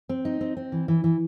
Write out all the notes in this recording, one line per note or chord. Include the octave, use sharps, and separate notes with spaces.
C4
D#4
C4
C4
E3
E3
E3